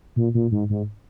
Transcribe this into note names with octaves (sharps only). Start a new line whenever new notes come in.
A#2
A#2
G#2
G#2